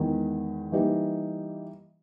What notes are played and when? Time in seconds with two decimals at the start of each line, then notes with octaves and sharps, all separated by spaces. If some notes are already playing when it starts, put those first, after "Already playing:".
Already playing: E2 D#3 G#3
0.72 E3 G3 A#3 D#4 G4